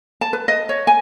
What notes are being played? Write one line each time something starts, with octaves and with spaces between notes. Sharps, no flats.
A5
B4
D#5
C#5
G#5